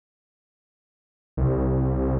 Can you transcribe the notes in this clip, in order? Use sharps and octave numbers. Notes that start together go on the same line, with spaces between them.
C2